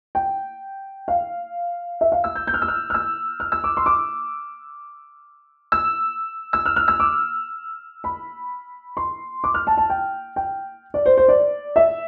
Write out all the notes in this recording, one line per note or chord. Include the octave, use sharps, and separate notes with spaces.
G5
F5
E5
F5
E6
G6
G6
F6
E6
F6
F6
E6
F6
E6
D6
C6
D6
E6
E6
F6
F6
E6
D6
B5
C6
D6
F6
A5
A5
G5
G5
D5
C5
C5
D5
E5